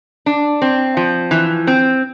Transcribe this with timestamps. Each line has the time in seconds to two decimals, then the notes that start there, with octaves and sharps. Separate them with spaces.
0.26 D4
0.62 C4
0.97 F3
1.31 E3
1.67 C4